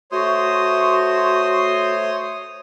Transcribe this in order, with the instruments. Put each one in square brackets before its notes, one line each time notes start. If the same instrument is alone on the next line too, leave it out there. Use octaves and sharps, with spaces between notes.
[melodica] A3 C5 [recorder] F#4 [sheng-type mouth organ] C#5 C6 D#6